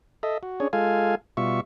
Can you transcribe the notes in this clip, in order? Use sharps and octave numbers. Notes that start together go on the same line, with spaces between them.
A4 D#5 E5
F#4
C#4 D4 G#4 C#5
G#3 F4 A4 F5 G#5
B2 G3 F4 E5 C#6